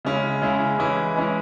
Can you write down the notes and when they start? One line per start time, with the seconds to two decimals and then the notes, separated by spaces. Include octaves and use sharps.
0.05 C#3 G#3 C#4 E4
0.42 C#3 G#3 C#4 E4
0.79 E3 G#3 C#4 E4
1.16 E3 G#3 C#4 E4